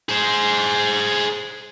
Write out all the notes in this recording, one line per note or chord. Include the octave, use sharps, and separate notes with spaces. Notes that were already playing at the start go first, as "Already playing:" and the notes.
G#4 C5